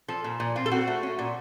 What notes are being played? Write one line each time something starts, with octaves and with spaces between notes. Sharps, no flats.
F3 A4
A#2
A#2
C4 F4
A4
C4 F#4
A3
C#4
A#2